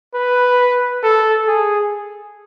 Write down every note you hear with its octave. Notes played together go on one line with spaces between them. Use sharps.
B4
A4
G#4